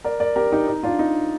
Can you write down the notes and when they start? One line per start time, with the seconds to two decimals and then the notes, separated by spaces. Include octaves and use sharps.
0.04 A#4 D5
0.20 A#4 D5
0.36 G4 A#4
0.52 D#4 G4
0.68 D#4
0.83 D4 F4
0.99 D#4